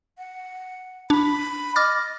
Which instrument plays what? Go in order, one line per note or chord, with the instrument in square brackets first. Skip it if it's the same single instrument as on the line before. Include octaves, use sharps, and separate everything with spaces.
[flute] F#5
[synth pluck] D4 [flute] B5
[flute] D#5 [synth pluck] D6 F6 A6